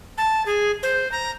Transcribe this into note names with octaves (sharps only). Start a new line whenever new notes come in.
A5
G#4
C5
A#5